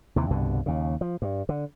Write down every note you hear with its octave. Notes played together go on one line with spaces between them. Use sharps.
D#2 C3 E3
C2 G2 B2 D3
D#2 C#3
F3
G2
D3